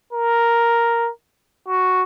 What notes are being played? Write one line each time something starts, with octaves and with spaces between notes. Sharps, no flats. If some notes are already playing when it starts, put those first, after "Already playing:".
A#4
F#4